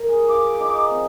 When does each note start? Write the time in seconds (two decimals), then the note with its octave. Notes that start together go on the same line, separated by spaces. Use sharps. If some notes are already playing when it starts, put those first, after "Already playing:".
Already playing: A#4
0.09 G#4
0.29 F4 D6
0.60 D#4
0.91 C4